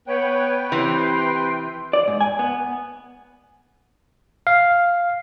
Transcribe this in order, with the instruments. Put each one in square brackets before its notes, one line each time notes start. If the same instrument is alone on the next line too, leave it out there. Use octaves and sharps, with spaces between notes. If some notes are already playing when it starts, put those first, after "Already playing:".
[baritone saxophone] B3 [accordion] B4 G5 [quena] C#5
[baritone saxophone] C3 [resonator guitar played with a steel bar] E3 [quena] C6
[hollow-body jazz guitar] D5
G#2
G#5
B3
[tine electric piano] F5